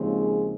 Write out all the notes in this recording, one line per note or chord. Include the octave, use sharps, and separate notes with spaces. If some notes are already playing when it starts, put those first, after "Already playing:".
Already playing: D#2 C#3 F3 G#3 C4
G#4